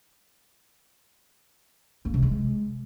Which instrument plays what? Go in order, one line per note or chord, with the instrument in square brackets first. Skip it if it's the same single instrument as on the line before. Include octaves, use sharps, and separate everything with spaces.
[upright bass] A#3
C3
G#3